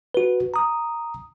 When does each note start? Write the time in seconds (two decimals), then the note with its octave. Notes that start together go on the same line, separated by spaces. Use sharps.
0.14 F#4 B4
0.54 A#5 D#6